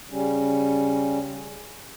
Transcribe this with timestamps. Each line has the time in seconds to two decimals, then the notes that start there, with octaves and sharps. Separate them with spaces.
0.09 C#3 G3 C#4